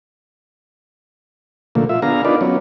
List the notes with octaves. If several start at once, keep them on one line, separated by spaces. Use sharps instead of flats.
A#2 D3 F3 A3 A#3
F4 E5
B3 D4 G#4 F5 A#5
D4 D#4 F4 A#4 B4 D5
F#3 B3 C#4